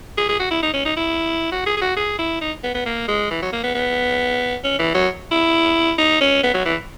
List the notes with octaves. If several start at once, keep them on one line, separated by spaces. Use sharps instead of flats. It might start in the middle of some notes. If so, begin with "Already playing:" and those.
G#4
G#4
F#4
E4
D#4
C#4
D#4
E4
F#4
G#4
G#4
F#4
G#4
E4
D#4
B3
B3
A#3
G#3
E3
F#3
A#3
B3
B3
C#4
E3
F#3
E4
D#4
C#4
B3
F#3
E3